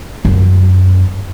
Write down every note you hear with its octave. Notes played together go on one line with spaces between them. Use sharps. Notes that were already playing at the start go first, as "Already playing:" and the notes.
F#2